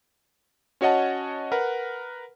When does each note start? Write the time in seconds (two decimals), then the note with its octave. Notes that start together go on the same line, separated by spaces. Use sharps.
0.81 C#4 F#4 C#5 D#5 F#5 A5
1.52 A#4 B4 F#5